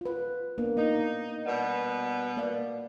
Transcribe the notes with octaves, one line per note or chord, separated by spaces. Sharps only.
F4 B4
A#3 B3 D4
A#3 D#4
B2 G3 B3
A#3 D5 F5